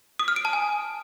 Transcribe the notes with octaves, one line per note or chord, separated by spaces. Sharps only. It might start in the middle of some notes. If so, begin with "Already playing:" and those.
D#6
F6
D7
A5
G#5